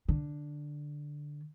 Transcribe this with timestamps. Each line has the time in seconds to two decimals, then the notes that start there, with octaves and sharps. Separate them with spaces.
0.09 D3